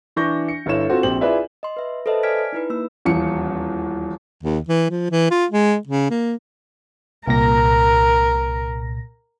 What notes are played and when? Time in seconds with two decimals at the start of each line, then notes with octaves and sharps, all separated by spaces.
0.16 E3 D4 C#6 G6 A#6
0.48 C#7
0.66 G1 E4 A4 C#5 E7
0.89 C4 F4 F#4 A4
1.03 A#1 C4 G4 F#7
1.21 E4 F4 G#4 B4 D5 E5
1.63 D#5 C6
1.77 B4 E5
2.06 A4 B4 C5 D#5 E5 A5
2.23 D5 G#5 F6 G#6 B6 D7
2.52 D#4 E4 B4
2.70 A#3 E6
3.05 D#1 E2 C#7
4.43 D#2
4.69 E3
4.90 F3
5.11 E3
5.31 F4
5.50 G#3
5.87 C#3
6.10 A#3
7.28 C2 A#2 A#4 A#6